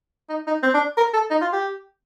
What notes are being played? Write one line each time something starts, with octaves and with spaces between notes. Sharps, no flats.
D#4
D#4
C4
D4
A#4
A4
D#4
F4
G4